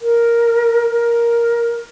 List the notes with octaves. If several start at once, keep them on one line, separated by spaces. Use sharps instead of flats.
A#4
A#4